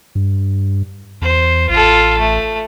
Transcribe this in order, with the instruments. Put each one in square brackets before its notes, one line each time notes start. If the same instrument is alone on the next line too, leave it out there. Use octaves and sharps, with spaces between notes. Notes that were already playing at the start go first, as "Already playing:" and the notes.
[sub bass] G2
[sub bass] E2 [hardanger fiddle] C5
[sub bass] A1 [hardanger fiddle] F4 A4
[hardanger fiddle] A3